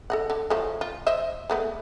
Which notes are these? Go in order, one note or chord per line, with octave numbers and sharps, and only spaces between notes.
A4 D#5 F#5
D3
F3 F#3 A3
F4
C5 D#5 E5
G#3 A3 B3